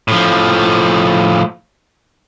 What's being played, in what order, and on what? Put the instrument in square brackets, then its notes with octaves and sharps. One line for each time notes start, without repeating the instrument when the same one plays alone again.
[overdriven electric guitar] A2 F3